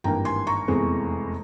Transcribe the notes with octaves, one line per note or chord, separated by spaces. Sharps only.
G#1 G2 E3 A#3 G5 A#5
G#5 C6
A#5 C#6
F1 E2 E3 G#3 C4